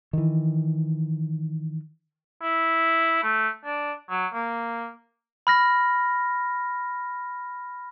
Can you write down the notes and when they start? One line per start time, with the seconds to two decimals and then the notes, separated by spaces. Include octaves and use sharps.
0.13 D#3 E3
2.42 E4
3.23 A3
3.65 D4
4.10 F#3
4.34 A#3
5.47 B5 F6 A#6